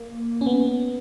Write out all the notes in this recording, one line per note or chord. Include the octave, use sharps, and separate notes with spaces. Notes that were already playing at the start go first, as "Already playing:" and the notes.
Already playing: A#3
C#4
B3